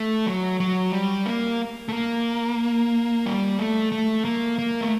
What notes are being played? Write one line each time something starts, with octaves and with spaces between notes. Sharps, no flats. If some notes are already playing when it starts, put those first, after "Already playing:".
Already playing: A3
F#3
F#3
G3
A#3
A3
A#3
G3
A3
A3
A#3
A#3
A3